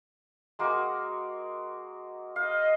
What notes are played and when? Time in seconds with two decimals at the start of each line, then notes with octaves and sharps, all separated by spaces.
0.59 G#3 A#3 F#4
2.36 D#5 F5